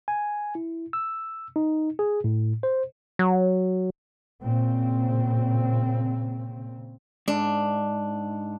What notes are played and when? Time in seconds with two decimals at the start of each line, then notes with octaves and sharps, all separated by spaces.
0.08 G#5
0.55 E4
0.93 E6
1.56 D#4
1.99 G#4
2.24 A2
2.63 C5
3.19 F#3
4.42 A#2 C#3 C4
7.28 G#2 D4